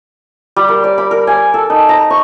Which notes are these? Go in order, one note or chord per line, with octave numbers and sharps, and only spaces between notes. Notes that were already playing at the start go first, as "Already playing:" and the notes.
G3
A#4
D5
B5
A#4
G#5
A4
D#4
A#5
C#6